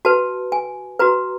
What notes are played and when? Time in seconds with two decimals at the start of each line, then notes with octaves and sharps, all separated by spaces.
0.05 F#4 B4 A5
0.52 G#5
0.99 F#4 B4 A#5